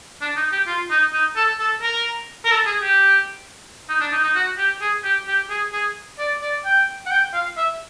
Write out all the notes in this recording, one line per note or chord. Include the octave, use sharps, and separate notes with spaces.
D4
D#4
G4
F4
D#4
D#4
A4
A4
A#4
A#4
A4
G#4
G4
D#4
D4
D#4
D#4
F#4
G4
G#4
G4
G4
G#4
G#4
D5
D5
G5
F#5
G5
F5
E5